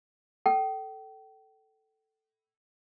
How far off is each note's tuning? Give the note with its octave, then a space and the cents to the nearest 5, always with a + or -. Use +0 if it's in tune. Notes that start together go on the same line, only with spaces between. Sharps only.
A4 +0 G5 -35